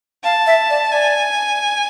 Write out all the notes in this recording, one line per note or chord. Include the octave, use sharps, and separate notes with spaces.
F5 A5
E5
D5
D5 G#5